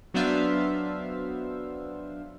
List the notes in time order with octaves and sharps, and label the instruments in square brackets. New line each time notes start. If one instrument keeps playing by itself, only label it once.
[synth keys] F#3 B3 D4 C5 E5 F5